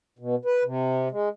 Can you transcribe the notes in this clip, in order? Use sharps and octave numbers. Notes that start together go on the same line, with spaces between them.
B2
B4
C3
G#3